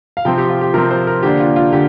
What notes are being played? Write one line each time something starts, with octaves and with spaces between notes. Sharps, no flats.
F5
C3 F3 C4 G5
G4
F4
G4
C3 F3 C4 A#4
C5
A#4
D3 A#3 D4 G4
F4
F4
D3 G4